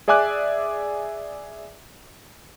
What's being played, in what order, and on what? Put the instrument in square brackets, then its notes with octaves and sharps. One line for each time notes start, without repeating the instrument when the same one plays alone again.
[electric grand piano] G#4 D5 E5 G#5 D6 F#6